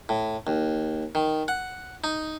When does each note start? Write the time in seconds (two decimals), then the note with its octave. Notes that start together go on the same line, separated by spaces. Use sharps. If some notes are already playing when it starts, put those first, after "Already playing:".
0.09 A2
0.47 D#2
1.15 D#3
1.48 F#5
2.04 D#4